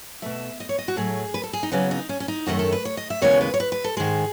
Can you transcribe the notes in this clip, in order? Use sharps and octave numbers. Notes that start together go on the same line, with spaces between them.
B2 A3 E5
D#5
C#5
D#5
F#4
A2 F#3 A3 G#4
B4
A4
G#4
D#4
E2 C#3 F#3 B3 C#4
D#4
C#4
C#4
D#4
F#2 D#3 A3 F#4
A4
B4
C#5
D#5
E5
D#2 C#3 E3 G#3 B3 C#5
B4
C#5
B4
B4
A4
G#2 D#3 G#3 G#4